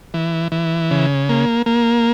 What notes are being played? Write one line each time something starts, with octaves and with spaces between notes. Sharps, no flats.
E3
E3
C#3
A#3
A#3